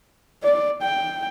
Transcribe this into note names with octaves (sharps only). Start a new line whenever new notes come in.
D5
G5